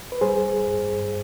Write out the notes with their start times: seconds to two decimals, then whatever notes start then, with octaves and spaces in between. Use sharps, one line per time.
0.12 B4
0.21 G3 G#4 C5
0.66 G2